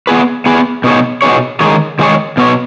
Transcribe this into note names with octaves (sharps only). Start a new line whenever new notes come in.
B3 G#4 B4
B3 G#4 B4
B2 B3 D#4 G#4 C#5
B2 B3 D#4 G#4 C#5
D#3 G#3 D#4 G#4 C#5
D#3 G#3 D#4 G#4 C#5
B2 B3 F#4 C#5